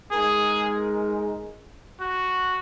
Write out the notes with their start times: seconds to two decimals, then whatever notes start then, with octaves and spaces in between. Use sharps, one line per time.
0.11 G#3 D#4 G#4 A#4
2.00 F#4